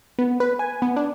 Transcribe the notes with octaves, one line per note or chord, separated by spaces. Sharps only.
B3
B4
G#5
B3
D4